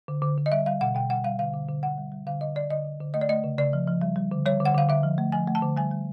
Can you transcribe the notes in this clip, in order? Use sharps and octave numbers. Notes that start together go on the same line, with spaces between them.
D3
D3
D3
D#5
G3 E5
G3 F5
B2 F#5
B2 G5
G3 F#5
G3 F5
D3 F5
D3
D3
D3 F#5
G3
G3
D3 F5
D3 D#5
D3 D5
D3 D#5
D3
D3
A3 D#5
D5
A3 D#5
C#3
C#3 D5
F3
F3
G3
G3
D3
G3 C#5
D3
F#5
D3 F5
D3 E5
F3
A3
F3 G#5
A3
A5
D3
G3 G#5
G3